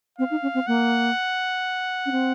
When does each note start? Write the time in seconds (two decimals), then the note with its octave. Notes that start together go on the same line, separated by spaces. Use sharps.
0.19 C4 F5
0.31 D#4
0.42 C#4
0.54 C4
0.67 A#3 F#5
2.06 C#4
2.12 C4